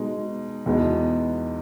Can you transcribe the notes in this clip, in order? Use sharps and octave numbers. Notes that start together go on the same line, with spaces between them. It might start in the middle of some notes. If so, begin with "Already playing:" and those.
Already playing: B2 G#3 D#4
E2 B2 G#3 B3 D#4